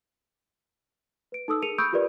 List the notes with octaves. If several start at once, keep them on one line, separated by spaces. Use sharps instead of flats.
B4 D7
D#4 A4 D#6 E6
G#4 A#4 C#7 D#7 F7
B5 C#6 D#6 E6 G6 D7
F4 G4 A#4 B4 D5